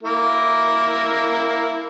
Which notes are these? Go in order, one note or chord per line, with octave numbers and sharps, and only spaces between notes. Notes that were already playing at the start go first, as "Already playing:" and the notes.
A#3 E4 A#4